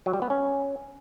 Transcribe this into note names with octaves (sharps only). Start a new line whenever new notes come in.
F#3
G3
B3
C#4